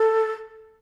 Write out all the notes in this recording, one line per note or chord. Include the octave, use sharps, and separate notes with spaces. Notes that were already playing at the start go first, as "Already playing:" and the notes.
Already playing: A4